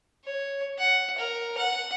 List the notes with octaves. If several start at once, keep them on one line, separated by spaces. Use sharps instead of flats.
C#5
F#5
A#4
F#5